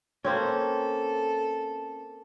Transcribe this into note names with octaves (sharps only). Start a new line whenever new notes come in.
A#3 C4 C#4 A4